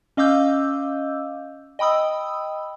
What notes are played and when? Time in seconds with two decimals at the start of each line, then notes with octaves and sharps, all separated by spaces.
0.17 C#4 D#5 F5 D6 E6 G6
1.79 D#5 G5 B5 D#6 E6